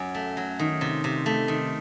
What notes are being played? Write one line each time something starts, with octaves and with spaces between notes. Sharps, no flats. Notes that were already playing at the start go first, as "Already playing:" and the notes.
Already playing: F#2 F#3
A3
F#3
D#3
C3
C3
A3
D#3